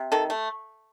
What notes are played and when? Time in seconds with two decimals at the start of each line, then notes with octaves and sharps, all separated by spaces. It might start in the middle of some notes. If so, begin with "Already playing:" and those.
Already playing: C3
0.12 D#3 A4
0.30 A3